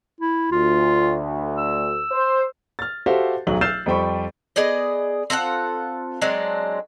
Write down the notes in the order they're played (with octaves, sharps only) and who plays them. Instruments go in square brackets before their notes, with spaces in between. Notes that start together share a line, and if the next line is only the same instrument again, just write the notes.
[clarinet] E4
[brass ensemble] D2 [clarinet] F4
[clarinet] E6
[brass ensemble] C5
[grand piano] F6 A6
F#4 G4 A4 C5 E5 F5
D1 B1 F#3 F#7
E6 F6 G6 A6 C7 E7
F2 G3 C5 G5 B5 C#6
[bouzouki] B3 G#4 D5 D#5
C4 F4 A4 F#5
F#3 G#3 C4 D4